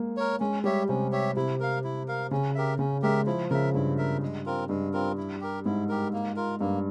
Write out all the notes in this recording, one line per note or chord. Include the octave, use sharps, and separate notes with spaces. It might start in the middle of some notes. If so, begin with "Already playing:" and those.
Already playing: G#3 A#3
A#4 C#5
G#3 C#4
G3 G4 C#5 E5
C3 C#4
G4 C#5 E5
C3 E4
A#4 F5
E4
A#4 F5
C#3 C#4
G4 A#4 E5
C#3 C#4
G#3 G4 A#4 E5
F3 E4
C#3 A#4 E5
G2 E4
A#4 E5
G#3
C4 F4 A#4
G2 G#3
C4 F4 A#4
E4
G4 A#4
G#2 E4
G4 A#4
A#3
F4 A#4
G2 A#3